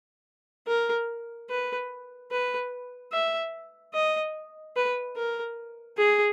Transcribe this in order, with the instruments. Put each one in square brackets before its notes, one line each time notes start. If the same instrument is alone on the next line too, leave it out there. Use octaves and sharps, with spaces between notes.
[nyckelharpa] A#4
B4
B4
E5
D#5
B4
A#4
G#4